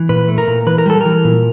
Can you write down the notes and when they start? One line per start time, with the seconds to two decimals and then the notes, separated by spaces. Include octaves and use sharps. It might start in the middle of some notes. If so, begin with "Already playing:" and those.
Already playing: E3
0.09 A#2 B4
0.28 A3
0.38 A#4
0.47 A#2
0.66 E3 B4
0.78 A#4
0.86 G3 A4
1.01 E3 A#4
1.24 A#2